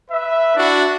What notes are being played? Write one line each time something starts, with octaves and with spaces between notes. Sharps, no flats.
B4 E5
D4 E4 F#4